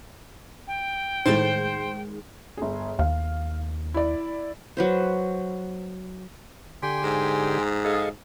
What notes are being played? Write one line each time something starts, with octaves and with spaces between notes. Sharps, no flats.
G5
A2 D#3 G#3 C5 A6 E7
G1 G#4
D#2 F5
E4 D5
F#3 B4 C5
D3 G4 G5 G#5 C6
G#2
G#4 A4 D#5 F5